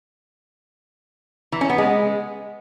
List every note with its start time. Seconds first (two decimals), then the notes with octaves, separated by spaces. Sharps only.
1.52 E3
1.61 C#4
1.70 B3
1.78 G#3